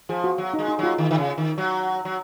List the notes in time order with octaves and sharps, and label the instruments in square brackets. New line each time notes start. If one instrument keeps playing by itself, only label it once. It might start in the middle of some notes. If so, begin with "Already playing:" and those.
[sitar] F3 [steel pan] G#4
[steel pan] F#4
[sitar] F#3
[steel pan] D#4
[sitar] G#3
[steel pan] D#4
[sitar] F#3 [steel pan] F4
[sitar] D#3
D#3
C#3
D#3
F#3
F#3